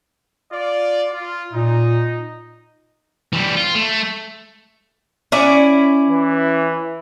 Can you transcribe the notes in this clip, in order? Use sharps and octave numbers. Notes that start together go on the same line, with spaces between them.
F4 D5
F4
A#2 D#4
E3 G3
F4
A3
C#4 E4 D5
E3